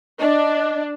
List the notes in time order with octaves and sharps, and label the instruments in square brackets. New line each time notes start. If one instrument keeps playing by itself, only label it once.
[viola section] D4 [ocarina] D#5